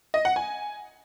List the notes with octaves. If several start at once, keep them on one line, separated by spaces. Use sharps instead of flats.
D#5
F#5
G#5